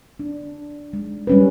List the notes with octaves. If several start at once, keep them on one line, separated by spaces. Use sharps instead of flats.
D4
G#3
G3 C#4 B4